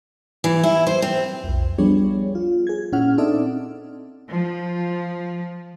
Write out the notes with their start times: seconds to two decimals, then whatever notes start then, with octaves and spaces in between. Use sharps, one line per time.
0.44 E3
0.63 E4
0.87 C5
1.02 C4
1.44 B1 F2
1.78 F3 G3 B3 D4 G#4 C#5
2.35 F4
2.67 G#4 G#6
2.92 A#2 C#4 E4 F#5 F6
3.18 C4 D4 D#4 A4 D5 E5
4.31 F3